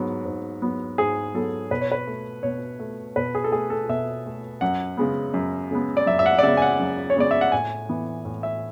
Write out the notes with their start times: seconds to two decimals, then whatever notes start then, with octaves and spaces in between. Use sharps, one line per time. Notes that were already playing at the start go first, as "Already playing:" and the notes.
Already playing: G#2 F#3 B3
0.25 G#2
0.62 F#3 B3
0.98 G#2 G#4
1.34 F#3 B3 A4
1.71 B2 B4
1.81 C#5
1.92 B4
2.07 A3
2.43 B2 C#5
2.80 A3
3.16 B2 B4
3.35 G#4
3.44 A4
3.52 A3 G#4
3.70 A4
3.89 B2 E5
4.26 A3
4.61 F#2 F#5
4.97 C#3 G#3 B3
5.34 F#2
5.71 C#3 G#3 B3
5.97 D5
6.06 F#2 E5
6.19 E5
6.26 F#5
6.39 D5
6.43 C#3 G#3 B3 E5
6.57 G#5
6.62 F#5
6.80 F#2
7.10 C#5
7.16 C#3 G#3 B3 D5
7.31 E5
7.41 F#5
7.52 A2 G#5
7.89 E3 B3
8.25 A2
8.43 E5